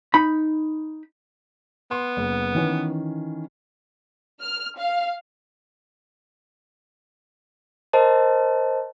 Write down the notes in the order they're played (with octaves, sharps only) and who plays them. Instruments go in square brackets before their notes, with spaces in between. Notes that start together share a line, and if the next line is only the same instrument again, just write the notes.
[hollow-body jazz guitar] D#4 B5
[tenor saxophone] B3 [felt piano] C6
[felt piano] F#1
D#3 E3 C#4
[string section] F6
F5
[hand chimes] A#4 C5 D#5 A5